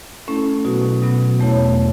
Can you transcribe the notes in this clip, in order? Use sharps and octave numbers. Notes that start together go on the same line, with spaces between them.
A3 C#4 E4 A4
B2 F#3 B3 F#4
B2 F#3 B3 F#4
E2 B2 A3 E4 C#5